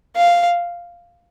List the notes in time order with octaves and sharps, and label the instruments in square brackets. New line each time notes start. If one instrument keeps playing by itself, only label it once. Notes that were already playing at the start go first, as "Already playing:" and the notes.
[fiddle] F5